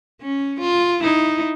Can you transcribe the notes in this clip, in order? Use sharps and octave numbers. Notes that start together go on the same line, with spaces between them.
C#4
F4
D#4 E4